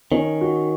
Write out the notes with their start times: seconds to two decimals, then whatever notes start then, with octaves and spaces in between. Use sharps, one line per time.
0.12 D#3 C#4
0.41 F#4